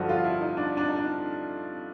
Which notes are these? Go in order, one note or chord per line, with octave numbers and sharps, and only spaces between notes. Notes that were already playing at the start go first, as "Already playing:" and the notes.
Already playing: G2 D3 F3 F#4
F4
E4
D#4
D4
D4
D#4
D4